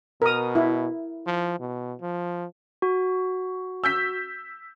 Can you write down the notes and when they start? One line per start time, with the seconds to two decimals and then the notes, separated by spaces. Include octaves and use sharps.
0.22 B2 A#4 D#6
0.55 E4
1.26 F3
1.60 B2
2.01 F3
2.82 F#4
3.84 E6 G6 B6